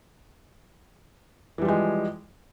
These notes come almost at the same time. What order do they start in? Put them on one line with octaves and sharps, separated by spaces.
E3 G3 F3 G#3